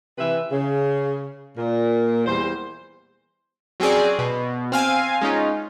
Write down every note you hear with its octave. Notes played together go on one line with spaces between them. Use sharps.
C3 E3 B4 E5
C#3
A#2
E2 G3 C5
F#3 C4 C#4 G#4 D5
B2
C4 F5 G#5
G#3 C#4 D#4 F4